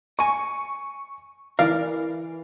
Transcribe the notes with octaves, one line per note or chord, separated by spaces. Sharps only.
D#5 G#5 C#6
E3 A#4 D5 F5